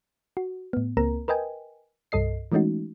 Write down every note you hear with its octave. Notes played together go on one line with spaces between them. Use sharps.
F#4
A2 B3
C#2 A#3 C4 A#4 A#5
A#4 B4 D#5 G5 G#5
C2 G2 A4 D#5 C7
E3 G#3 A3 C#4 D#4 F#4